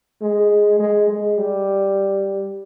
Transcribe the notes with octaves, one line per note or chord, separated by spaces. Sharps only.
G#3
G#3
G#3
G3